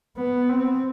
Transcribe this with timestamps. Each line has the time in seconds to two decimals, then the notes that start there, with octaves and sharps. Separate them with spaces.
0.17 B3
0.50 C4